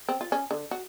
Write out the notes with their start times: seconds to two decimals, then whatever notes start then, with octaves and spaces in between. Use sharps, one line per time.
0.09 C4
0.21 F4
0.32 C#4
0.51 D3
0.71 F#4